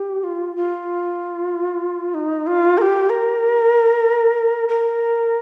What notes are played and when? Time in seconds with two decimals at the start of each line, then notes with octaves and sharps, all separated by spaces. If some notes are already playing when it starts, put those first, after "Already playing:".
Already playing: G4
0.23 F4
0.56 F4
2.14 D#4
2.47 F4
2.78 A#4
2.81 G4
3.10 A#4
4.68 A#4